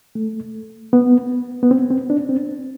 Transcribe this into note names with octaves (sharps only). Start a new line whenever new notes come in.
A3
B3
B3
C4
C4
D4
C4